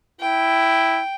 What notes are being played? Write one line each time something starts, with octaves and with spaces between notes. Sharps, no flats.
E4 G5